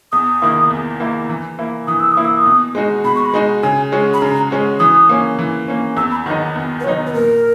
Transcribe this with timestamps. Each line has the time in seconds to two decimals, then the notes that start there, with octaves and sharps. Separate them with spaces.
0.12 E2 D#6
0.42 D#3 A#3 E4
0.71 E2
1.00 D#3 A#3 E4
1.29 E3
1.59 A#3 E4
1.87 E3 D#6
2.00 E6
2.12 D#6
2.17 A#3 E4
2.25 E6
2.37 D#6
2.46 B2
2.75 G#3 D#4 F#4
3.04 B2 B5
3.16 C#6
3.26 B5
3.34 G#3 D#4 F#4
3.63 C#3 G#5
3.92 G#3 C#4 F#4
4.14 B5
4.22 C#3 A#5
4.51 G#3 C#4 F#4
4.79 E3 D#6
5.09 A#3 C#4
5.39 E3
5.68 A#3 C#4
5.97 E2 E6
6.11 B5
6.26 D#3 F#3 B3 D#4 F#5
6.56 E2
6.80 B4
6.84 D#3 F#3 B3 D#4 C#5
7.07 B4
7.14 A#2 A#4